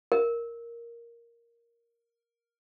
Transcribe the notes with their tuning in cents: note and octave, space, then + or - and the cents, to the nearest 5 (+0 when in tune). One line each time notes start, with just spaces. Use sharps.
A#4 +0